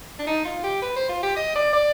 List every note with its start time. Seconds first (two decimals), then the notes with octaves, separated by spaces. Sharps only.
0.19 D4
0.27 D#4
0.45 F4
0.64 G4
0.82 B4
0.96 C5
1.09 F4
1.23 G4
1.37 D#5
1.55 D5
1.73 D5